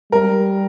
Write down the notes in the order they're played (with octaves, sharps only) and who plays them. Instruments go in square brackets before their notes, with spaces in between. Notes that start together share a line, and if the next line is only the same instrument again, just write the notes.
[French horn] G3 [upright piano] A#4